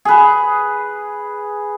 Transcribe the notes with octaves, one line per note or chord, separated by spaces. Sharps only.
G#4 B4